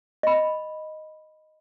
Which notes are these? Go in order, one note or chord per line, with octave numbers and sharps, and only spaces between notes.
D#5 B5